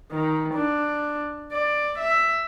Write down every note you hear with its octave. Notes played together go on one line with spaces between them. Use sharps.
D#3
D4
D5
E5